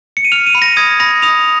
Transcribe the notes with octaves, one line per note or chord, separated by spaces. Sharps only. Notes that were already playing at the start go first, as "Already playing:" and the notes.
C#7
D#7
F6 F7
D#7
B5
A#6
D#6 G#6
B5 A#6
D#6 F7